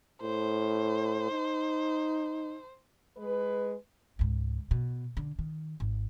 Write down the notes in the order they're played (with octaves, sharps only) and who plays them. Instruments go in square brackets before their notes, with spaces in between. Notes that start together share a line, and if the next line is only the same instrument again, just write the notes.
[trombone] A2 [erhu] C5
[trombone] D#4
[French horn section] G#3 B4
[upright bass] C#2 G#2
B2
D3
D#3
G#1